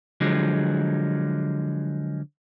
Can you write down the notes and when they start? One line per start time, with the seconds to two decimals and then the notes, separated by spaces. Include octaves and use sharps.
0.21 D3 F3 F#3 G#3